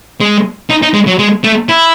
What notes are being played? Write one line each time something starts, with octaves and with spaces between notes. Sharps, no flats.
G#3
D#4
D#4
G#3
F#3
G#3
A3
E4